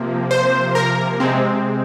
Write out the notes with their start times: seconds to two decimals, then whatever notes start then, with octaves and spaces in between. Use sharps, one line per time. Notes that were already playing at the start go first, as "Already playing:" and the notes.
Already playing: C3 F3 A#3
0.31 C5
0.75 A#4
1.20 C3 G#3 C4